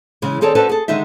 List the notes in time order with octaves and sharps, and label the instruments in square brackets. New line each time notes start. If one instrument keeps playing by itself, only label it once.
[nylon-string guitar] C#3 E3 G#3
D#3 C4 G#4 A4 C#5 D5
C#4 D4 F#4 A4 B4 C5
G#4 A4
D3 D#3 G#3 D#4 E5